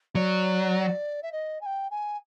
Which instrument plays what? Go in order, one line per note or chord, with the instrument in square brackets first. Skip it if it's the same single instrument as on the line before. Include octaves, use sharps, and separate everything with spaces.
[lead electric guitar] F#3 [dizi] D5
[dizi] E5
D#5
G#5
G5
G#5